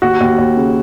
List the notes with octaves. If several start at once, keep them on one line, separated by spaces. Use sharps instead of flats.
D#2 F#4
D#2
D#2
C#3